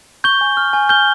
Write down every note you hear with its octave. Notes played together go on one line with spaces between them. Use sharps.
C#6 G6 G7
G#5
F6
G#5
F6 G6 G7